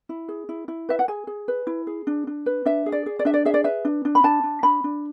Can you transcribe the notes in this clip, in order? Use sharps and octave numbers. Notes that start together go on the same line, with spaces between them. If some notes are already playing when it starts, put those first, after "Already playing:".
E4
G#4
E4
E4
B4 E5
F#5
G#4 G#5
G#4
B4
E4
G#4
D4
D4
B4
D4 E5
G#4
D5
G#4
D5
D4 E5
D5
G#4 E5
D5
B4 E5
D4
D4
B5
D4 A5
D4
D4 B5
D4